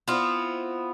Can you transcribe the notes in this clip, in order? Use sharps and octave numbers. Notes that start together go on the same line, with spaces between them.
B3 C4 E4 F4